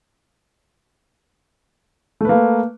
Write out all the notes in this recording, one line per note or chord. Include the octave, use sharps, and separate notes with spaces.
A3 A#3 B4